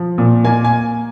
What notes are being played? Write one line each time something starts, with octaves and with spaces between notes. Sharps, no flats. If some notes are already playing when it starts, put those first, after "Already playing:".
Already playing: F3
A#2
A#3 G#5
G#5